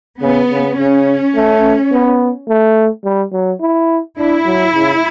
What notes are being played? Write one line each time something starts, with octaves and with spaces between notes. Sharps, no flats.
C#3 B3
C#3
C#3 C#4
A3
B3
A3
G3
F#3
E4
D4 E4
F#3
C#3